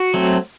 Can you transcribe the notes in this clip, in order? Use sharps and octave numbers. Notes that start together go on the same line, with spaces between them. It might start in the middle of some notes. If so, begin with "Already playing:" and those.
Already playing: F#4
F#3 A3 C4